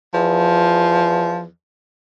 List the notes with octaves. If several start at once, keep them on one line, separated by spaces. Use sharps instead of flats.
E2 F3